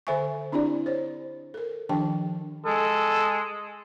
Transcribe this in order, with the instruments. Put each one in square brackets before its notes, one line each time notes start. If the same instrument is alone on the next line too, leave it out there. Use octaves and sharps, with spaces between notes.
[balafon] D3 A4 C5 E5 G#5 C#6
C4 D4 E4 G4 D5
C5 C#5
A4 A#4
D#3 F3 D4 G4 G5 A5
[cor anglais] G#3 [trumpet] A4